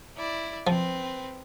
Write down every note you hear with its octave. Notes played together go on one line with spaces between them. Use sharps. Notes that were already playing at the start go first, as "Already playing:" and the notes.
E4 D5
F3 C4 B4